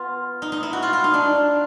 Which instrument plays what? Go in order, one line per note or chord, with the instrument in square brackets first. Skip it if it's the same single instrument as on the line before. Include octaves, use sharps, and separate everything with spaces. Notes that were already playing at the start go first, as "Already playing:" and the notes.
Already playing: [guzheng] B3 F4
D#4
D#4
E4
F#4
F4
F4
D#4
D4